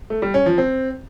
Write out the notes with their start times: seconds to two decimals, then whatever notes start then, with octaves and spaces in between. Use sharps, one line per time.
0.10 A3
0.22 G3
0.34 C#4
0.46 F3
0.58 C4